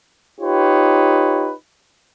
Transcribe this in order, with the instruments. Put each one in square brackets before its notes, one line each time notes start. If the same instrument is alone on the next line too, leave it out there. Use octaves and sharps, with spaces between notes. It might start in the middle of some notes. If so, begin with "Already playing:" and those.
[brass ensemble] D#4 F4 G4 B4 C#5